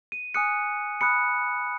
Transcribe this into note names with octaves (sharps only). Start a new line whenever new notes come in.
D#7
G#5 D#6 F#6 C#7
B5 D#6 F#6 C#7